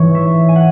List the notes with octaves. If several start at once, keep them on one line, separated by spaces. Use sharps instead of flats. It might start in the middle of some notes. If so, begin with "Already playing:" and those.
Already playing: A1 G#2 E3 C#5
E5
G#5
F#5